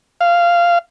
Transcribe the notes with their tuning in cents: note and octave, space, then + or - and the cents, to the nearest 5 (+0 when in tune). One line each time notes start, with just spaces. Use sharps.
F5 -10